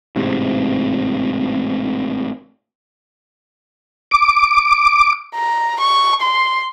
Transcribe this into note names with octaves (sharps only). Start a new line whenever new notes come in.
A1 G#2 C3
D6
A#5
C#6
C6